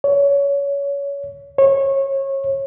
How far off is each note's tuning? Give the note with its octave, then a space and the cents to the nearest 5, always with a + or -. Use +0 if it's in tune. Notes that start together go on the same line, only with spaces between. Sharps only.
C#5 +25
C#5 -25